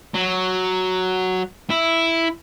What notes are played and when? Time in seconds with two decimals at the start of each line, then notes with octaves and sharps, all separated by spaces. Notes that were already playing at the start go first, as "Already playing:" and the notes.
0.14 F#3
1.70 E4